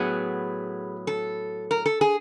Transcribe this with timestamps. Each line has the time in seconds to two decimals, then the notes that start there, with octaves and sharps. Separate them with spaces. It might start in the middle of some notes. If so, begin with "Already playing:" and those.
Already playing: A2 F#3 B3 G#4
1.07 A4
1.71 A#4
1.86 A4
2.01 G#4